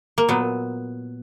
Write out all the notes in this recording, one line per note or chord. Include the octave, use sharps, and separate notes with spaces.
A#3
A#2 F#3 B3